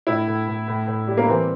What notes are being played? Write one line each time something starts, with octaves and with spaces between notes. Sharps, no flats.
A2 E4
A2
A2
A2
A2
G3
A#3
E3 C4